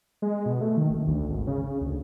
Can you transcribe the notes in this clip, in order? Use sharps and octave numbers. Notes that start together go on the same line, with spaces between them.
G#3
B2
A3
D#3
F#1
D2
G#1
C#3
C#3
D2